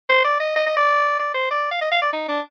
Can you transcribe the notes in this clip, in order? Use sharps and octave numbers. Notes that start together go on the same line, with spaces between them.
C5
D5
D#5
D#5
D#5
D5
D5
C5
D5
F5
D#5
F5
D5
D#4
D4